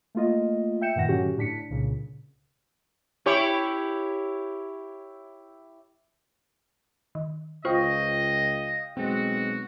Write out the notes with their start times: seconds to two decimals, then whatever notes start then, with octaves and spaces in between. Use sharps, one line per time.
0.15 A3 A#3 F4 D#5
0.81 E5 G5 G6 C#7 E7
0.96 G2 A#2 D#3 F#5 A#6
1.09 D3 F#3 C#4 F#4 G4
1.38 A2 D4 B6 C#7
1.70 C2 A#2 C#3
3.26 E4 G4 C#5
7.15 D#3
7.65 C#2 F4 C5 D#5 F5 G5 C#6
8.97 B1 G#3 C4 F#4